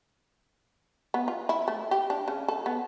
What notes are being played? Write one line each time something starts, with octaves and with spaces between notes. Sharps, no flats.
B3
F4
E4
A3
G4
D4
C#3
A4
B3